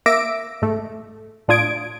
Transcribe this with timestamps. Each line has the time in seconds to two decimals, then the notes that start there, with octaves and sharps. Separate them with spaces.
0.06 A#3 E5 D6 E6 A#6 D7
0.62 G#2 A3
1.48 A2 D4 F4 D#6 G#6 D7